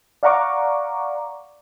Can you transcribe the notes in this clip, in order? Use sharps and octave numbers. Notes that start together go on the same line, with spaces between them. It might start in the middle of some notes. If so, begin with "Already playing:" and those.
D5 F5 F#5 A#5 C#6 D6